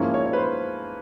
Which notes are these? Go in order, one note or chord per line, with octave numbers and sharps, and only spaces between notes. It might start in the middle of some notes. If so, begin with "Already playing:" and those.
Already playing: G#2 F3 A#3 C#4 E4
C#5
C#5
B4
C5